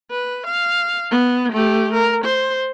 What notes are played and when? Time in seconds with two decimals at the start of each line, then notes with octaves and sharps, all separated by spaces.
0.11 B4
0.46 F5
1.11 B3
1.52 A3 G4
1.94 A#4
2.24 C5